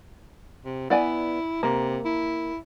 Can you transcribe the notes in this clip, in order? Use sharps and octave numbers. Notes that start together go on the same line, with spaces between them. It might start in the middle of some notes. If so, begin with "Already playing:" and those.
C3
B3 E4 D5 G#5
C3 A#3
E4